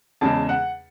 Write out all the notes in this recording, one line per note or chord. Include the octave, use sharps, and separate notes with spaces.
E2 C#3 G#3 A5
F#5